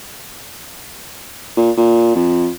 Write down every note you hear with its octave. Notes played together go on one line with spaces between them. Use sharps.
A#2
A#2
F2